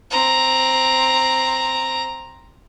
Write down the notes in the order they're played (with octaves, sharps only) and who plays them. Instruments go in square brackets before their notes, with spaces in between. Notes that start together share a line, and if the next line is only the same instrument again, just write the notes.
[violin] C4 A#5